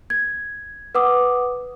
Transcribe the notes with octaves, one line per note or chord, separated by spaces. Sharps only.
G#6
B4 F#5 D6 D#6